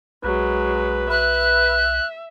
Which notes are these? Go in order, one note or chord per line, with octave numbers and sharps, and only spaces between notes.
B1 F#3 G#3 B4
B4 E5 F#6